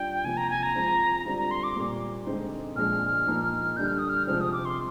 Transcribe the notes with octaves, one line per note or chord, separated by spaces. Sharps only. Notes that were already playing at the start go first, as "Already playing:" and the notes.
Already playing: G3 D4 F4 G5
C3 F3 A#3 G#5
A#5
G#5
A#5
F3 G#3 C4 F4
D3 G3 C4 F4 A#5
A#5
C6
D6
A#2 G3 A#3
D3 G#3 C4 D#4
A#2 F3 G#3 D4 F6
A#2 F3 A#3 D#4
D3 G3 D4 G6
F6
D#6
F6
C3 F3 G#3 C4 F6
D#6
D6
C6